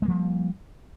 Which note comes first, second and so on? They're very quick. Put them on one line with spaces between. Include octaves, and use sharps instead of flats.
G#3 A#3 F3 G3